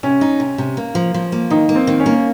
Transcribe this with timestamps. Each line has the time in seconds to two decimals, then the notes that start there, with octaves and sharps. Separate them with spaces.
0.03 C3 C#4
0.21 D#4
0.40 C3
0.58 C3
0.77 A#3
0.95 F3
1.14 F3
1.32 A#3
1.50 D#3 D#4
1.69 A#3
1.75 C4
1.87 D#3
2.00 C#4
2.06 A#3